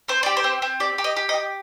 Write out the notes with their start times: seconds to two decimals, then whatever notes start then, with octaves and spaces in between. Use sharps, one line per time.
0.08 C4 C5
0.23 G4 D5
0.37 C5
0.44 C4
0.62 C4
0.80 G4 D5
0.98 G4
1.04 D#5
1.16 G4
1.29 D#5
1.34 G4